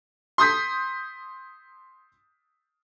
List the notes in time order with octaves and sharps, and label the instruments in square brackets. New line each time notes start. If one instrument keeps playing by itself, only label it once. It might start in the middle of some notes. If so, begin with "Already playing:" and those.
[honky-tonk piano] C6 D#6 G6 B6